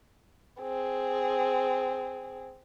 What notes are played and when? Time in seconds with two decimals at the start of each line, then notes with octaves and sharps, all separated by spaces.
0.61 C4 G#4